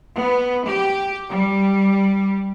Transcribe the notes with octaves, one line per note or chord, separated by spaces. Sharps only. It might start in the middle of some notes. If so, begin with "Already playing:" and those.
B3
G4
G3